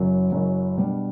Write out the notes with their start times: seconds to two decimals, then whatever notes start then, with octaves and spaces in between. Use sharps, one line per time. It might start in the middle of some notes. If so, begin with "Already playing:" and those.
Already playing: F#1 F#2 F#3
0.32 F#1 F#2 F#3
0.77 B2 G3 D4